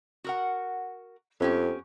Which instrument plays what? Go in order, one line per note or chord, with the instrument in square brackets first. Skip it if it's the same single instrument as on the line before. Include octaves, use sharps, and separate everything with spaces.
[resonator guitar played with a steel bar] F#4 A#4 F#5
[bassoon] F2 [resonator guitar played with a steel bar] B3 C#4 G4